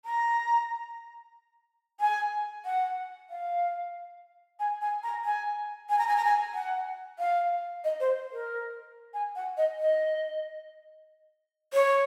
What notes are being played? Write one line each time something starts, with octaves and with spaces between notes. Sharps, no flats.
A#5
G#5
F#5
F5
G#5
G#5
A#5
G#5
G#5
A#5
G#5
A#5
G#5
F#5
F5
D#5
C5
A#4
G#5
F#5
D#5
D#5
C#5